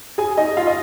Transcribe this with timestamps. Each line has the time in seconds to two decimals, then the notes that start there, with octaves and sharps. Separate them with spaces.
0.18 G#4 G#5
0.37 D#4 D#5
0.57 F4 F5
0.67 D#5